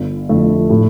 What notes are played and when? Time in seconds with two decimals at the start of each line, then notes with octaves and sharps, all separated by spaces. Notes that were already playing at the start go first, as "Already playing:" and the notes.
Already playing: G1
0.29 F2 D3 A3 E4
0.70 A2